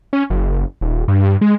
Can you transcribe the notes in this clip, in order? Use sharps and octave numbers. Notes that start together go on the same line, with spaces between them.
C#4
F#1
D#1
G2
G#3